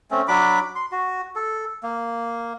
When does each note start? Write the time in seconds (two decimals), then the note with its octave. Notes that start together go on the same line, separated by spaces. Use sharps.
0.11 A3 C4 C#4
0.28 F#3 D4 B5 D6
0.75 C6
0.92 F#4
1.36 A4
1.83 A#3